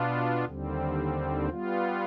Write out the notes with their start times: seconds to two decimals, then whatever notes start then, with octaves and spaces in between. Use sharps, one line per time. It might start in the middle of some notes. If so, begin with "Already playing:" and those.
Already playing: B2 B3 D4 F4
0.45 D#2 D3 G3 C4
1.49 G3 B3 F4